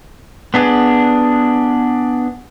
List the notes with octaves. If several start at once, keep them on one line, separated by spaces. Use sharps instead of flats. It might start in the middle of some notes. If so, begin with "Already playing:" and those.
B3 D4 G#4